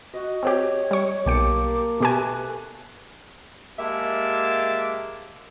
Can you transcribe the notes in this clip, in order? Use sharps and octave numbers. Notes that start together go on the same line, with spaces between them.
F#4 D#5
C4 F#4 G4 C#5
G3 C#6
B1 A#3 G4 G5 A5 D6 C#7
B2 A3 G4 B4 G#5
G#3 A#3 G4 E5 A5